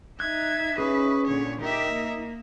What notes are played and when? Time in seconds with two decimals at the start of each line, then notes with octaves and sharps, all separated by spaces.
0.20 D#4 E5 F#6 G#6
0.78 C#4 G#4 B4
1.27 A#2 D3 C#5
1.61 D#4 G4 A#4 E5
1.93 A#3